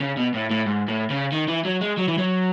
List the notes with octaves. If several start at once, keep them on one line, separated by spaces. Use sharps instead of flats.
C#3
B2
A2
A2
G#2
A2
C#3
D#3
E3
F#3
G#3
F#3
E3
F#3